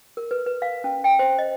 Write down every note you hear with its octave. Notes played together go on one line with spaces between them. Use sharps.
A#4
B4
B4
F5
C#4
G5
C5
D#5